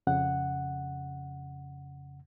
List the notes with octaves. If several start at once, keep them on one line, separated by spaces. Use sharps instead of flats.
F2 C#3 F#5